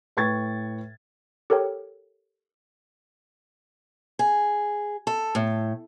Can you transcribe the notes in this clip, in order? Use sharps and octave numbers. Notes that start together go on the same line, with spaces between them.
A2 B4 G5 C#6 G#6 A6
G4 A4 A#4 C#5 G5
G#4
A4
A2